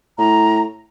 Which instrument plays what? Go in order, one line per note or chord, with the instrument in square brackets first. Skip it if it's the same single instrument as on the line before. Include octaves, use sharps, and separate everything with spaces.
[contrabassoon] A2 [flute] A#5